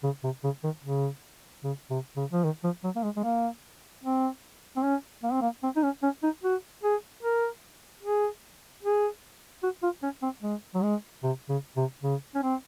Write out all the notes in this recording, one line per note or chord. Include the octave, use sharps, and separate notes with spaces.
C#3
C3
C#3
D#3
C#3
C#3
C3
C#3
F3
D#3
F3
F#3
A#3
G#3
G#3
A#3
C4
C4
C#4
A#3
C4
A#3
C4
D#4
C#4
C#4
D#4
F#4
G#4
A#4
G#4
G#4
F#4
F4
C#4
C4
G#3
F#3
G#3
C3
C#3
C3
C#3
C#4
C4